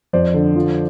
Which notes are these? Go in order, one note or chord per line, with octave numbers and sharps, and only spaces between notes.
F2 C5 D5
D3
F3